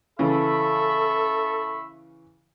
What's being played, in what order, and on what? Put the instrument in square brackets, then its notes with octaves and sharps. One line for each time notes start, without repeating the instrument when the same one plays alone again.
[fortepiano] C#3 E3 [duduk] A4 [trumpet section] E5 B5 C#6